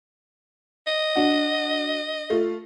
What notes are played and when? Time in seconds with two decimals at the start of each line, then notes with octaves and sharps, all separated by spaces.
0.87 D#5
1.16 D4 F#4
2.30 A3 F4